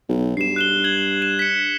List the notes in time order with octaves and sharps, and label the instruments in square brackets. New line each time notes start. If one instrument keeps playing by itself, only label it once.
[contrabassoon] B1
[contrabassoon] G2 [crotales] C7 E7
[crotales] F#6 E7 G7
G#6 F#7
E7
B6 C#7